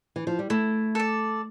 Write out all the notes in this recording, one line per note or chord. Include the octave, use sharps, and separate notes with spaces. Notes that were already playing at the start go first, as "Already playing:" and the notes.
E3
F3
G3
A3 E4
A4 D5